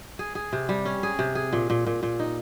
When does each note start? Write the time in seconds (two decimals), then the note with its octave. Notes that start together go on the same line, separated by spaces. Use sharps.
0.19 G#4
0.35 G#4
0.53 C3
0.69 G3
0.85 C#4
1.03 G#4
1.19 C3
1.35 G#4
1.53 A#2
1.70 A#2
1.86 A#2
2.03 A#2
2.20 D#4